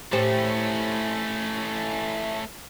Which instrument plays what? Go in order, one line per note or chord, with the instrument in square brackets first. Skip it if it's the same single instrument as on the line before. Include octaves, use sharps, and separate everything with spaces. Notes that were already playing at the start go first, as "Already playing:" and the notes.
[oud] A2 G4 C5 [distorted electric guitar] A3 C#4